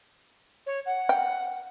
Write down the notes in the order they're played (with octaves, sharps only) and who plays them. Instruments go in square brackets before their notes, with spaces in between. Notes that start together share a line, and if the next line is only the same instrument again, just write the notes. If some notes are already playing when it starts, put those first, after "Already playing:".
[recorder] C#5
F#5
[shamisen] G5